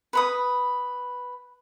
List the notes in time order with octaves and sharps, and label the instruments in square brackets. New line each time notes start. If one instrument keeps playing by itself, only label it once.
[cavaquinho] B4 B5 D#6